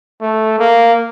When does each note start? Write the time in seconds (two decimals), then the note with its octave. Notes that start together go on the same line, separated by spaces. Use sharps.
0.22 A3
0.59 A#3